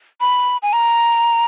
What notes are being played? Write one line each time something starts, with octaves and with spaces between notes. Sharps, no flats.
B5
G#5
A#5